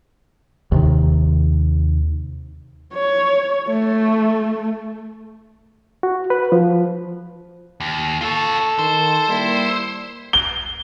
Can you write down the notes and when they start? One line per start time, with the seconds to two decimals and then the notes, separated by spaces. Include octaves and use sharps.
0.72 D#2 C3 D#3
2.94 C#5
3.68 A3
6.03 F#4
6.30 B4
6.52 F3
7.80 D#2
8.21 F4 A4 C#5
8.79 D#3 C5
9.29 G3 A#3 E4
10.33 G7